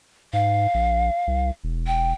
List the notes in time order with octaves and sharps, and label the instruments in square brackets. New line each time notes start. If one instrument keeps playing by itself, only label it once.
[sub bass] G#2 [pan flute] F5
[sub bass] A#1
C2
E1
[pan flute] G5